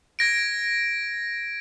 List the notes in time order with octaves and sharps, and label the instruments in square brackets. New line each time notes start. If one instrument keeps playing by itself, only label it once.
[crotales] G#6 A#6 D7